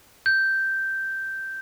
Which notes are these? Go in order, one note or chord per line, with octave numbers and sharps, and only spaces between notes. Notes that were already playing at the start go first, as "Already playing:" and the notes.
G6